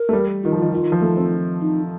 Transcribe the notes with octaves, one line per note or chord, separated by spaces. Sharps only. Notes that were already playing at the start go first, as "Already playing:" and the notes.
Already playing: A#4
A3
G3
D#3 F4
F3
D#3 F4
D#3 F4
D#3
F3
A3
C4
D#4